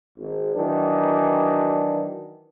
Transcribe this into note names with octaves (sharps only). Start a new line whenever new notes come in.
G#1
D#3 E3 F#3 D4